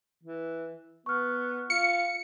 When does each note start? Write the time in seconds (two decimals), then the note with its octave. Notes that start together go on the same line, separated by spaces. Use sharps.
0.23 E3
1.06 B3 C#6 F6
1.70 F4 C#7